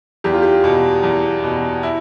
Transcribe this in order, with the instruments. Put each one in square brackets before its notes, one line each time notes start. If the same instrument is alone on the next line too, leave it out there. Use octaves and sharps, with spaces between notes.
[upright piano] E2 G4
F4
G4
B2
E2
B2
E4